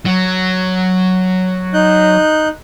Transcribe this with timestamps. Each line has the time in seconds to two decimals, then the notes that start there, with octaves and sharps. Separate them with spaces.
0.05 F#3
1.74 D#4 F#6 G6